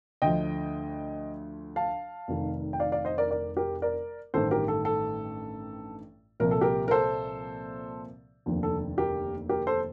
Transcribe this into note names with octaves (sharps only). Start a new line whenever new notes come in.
D2 D3 F3 D#5 G5
F5 A5
F1 F2 D#3
G5
D5 F5
D5 F5
C5 D#5
A#4 D5
A#4 D5
G4 A#4
A#4 D5
A1 G2 D#3 A4 C5
G4 A#4
A4
A4
C2 A#2 F3 A#4
A4
G4 A#4
A#4
A4 C5
F1 D#2 D3 F3
A4
G4 A#4
G4 A#4
A4 C5